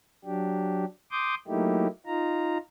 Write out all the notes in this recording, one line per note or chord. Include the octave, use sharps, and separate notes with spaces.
F#3 D4 G4
C6 D6 D#6 G6
F#3 A3 A#3 D#4 E4 G4
D#4 F4 A#5